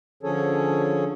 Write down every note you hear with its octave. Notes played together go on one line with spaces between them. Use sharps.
D3 F3 C#4 G#4 A4 C#5